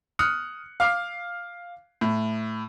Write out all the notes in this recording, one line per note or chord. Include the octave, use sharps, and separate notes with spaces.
D#6 F6 F#6 C#7
F5 D6 F6 C7
A2